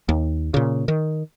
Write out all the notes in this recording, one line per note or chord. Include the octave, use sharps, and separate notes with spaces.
D#2
A#2 C#3
D#3